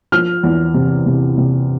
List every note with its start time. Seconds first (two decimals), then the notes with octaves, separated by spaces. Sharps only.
0.12 F3 F6
0.43 E2
0.74 C3
1.06 C3
1.37 C3